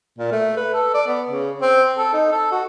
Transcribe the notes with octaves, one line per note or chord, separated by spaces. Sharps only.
A#2
A3
B4
A4
D5
B3
C#3
C4
A4
D#4
A4
F#4